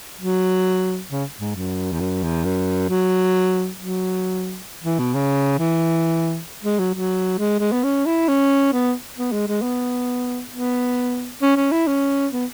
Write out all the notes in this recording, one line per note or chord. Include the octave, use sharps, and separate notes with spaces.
F#3
C#3
G#2
F#2
E2
F#2
E2
F#2
F#3
F#3
E3
B2
C#3
E3
G#3
F#3
F#3
G#3
G#3
B3
C#4
E4
C#4
B3
B3
G#3
G#3
B3
B3
C#4
C#4
E4
C#4
B3